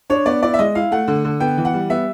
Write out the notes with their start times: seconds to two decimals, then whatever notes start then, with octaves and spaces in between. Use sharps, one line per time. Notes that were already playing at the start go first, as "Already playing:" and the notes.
0.10 D4 C#5
0.26 B3 D5
0.42 E4 D5
0.54 E5
0.59 G#3 D#5
0.75 E4 F5
0.91 A3 F#5
1.08 D3
1.25 D3
1.40 B3 G5
1.57 E3
1.65 F#5
1.73 G3
1.90 B3 E5